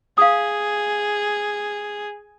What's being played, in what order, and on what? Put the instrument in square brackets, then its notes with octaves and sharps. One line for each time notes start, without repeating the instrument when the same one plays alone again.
[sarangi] G#4 [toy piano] F5 D#6